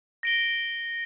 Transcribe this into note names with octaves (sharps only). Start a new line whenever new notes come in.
A#6 D7 G7